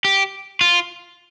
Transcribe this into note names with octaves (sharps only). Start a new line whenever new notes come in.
G4
F4